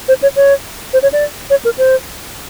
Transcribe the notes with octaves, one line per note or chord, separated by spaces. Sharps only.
C5
C#5
C#5
C5
C#5
D5
C#5
A#4
C5